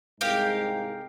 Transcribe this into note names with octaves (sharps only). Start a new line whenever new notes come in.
C2 G#2 G#3 G4 A#4 F5